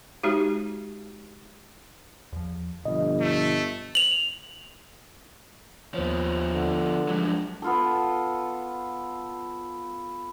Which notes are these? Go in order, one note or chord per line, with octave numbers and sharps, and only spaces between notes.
G#3 D#4 F#4 G4
E2 F3
G1 B2 F3 D#5
A3
F7 F#7
D#2 F3 B3 C5 C#5
D3
G2 F3 F#3 G#3 D4
B3 F4 A4